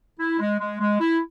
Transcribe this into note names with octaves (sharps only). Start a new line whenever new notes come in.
E4
G#3
G#3
G#3
E4